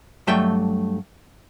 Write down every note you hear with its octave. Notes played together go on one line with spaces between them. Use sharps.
G2 F#3 A3 E5 G5